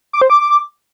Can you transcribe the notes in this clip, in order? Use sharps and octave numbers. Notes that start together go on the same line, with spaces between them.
D6
C5
D6